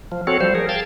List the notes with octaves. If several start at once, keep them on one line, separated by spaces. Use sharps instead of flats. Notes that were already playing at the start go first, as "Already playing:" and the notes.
F3
C4 F#4 A4 C#5
F3 G3 C5
G#4 A#4
F5 G5 A5 G#6 A6